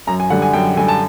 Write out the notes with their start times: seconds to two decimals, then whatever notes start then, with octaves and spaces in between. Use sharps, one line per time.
0.07 F#2 A#5
0.20 G#5
0.30 D3 G3 F#5
0.42 G#5
0.53 F#2 G5
0.77 D3 G3 G#5
0.88 A5